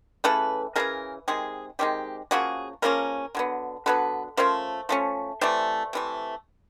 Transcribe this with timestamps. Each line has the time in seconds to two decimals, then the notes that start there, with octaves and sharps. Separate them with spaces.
0.24 C#3 E3 A3 A4 B4
0.76 C#3 E3 A3 G#4 A#4
1.28 C3 D#3 G#3 G#4
1.79 C3 D#3 G#3 G4
2.31 C#3 F3 A#3 F#4 G#4
2.82 C#3 F3 A#3 C#4 A#4
3.35 D3 F#3 B3
3.86 D3 F#3 B3 A4 B4
4.37 F3 A3 C#4 A#4 C5
4.89 F3 A3 C#4
5.41 C3 E3 A3 C5 D5
5.93 C3 E3 A3